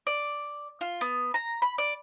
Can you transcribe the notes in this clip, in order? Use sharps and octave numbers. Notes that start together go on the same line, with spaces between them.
D5
F4
B3
A#5
B5
D5